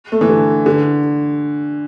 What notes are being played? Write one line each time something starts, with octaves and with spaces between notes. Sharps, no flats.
A3
E3
D3
D3